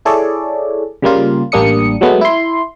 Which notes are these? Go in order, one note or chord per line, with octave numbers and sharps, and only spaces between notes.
E4 G#4 A4 C#5 D5
C#3 G3 A#3 F4
A1 G3 A#3 D4 D#6 C#7
F#3 G#3 A3 B3
E4 C6